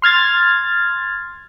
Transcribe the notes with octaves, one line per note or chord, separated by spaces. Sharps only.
C6 F6 G#6 A6